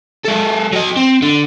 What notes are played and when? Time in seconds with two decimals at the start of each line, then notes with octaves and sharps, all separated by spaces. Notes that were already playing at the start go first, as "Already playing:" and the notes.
0.25 G#3 A4
0.72 F#3 D#5
0.96 C4
1.22 D3